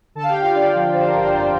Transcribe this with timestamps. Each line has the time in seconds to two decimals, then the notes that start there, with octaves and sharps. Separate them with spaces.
0.15 D3 A4 A5
0.23 F5
0.29 G4 G5
0.35 D3
0.42 F4 F5
0.54 D3 D4 D5
0.75 F3
0.93 D3 C5
1.07 A#4
1.14 G1
1.20 C5
1.33 F2 C5